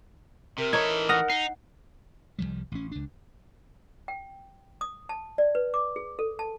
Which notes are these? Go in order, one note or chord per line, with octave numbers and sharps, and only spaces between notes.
C3 A#4
E3 D#4 A4 C#5 G#6
F#5 D#6 F6 A#6
D#4 C7
C2 F#2 F3 G3
A1 C#4
C#2 D4
G5
D#6
A5
D5
B4
D6
G#4
A4
A5